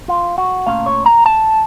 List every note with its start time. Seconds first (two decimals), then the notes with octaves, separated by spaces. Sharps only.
0.08 F4
0.38 F#4
0.66 A#2 A3 C#4 F5
0.86 C#5
1.06 A#5
1.26 A5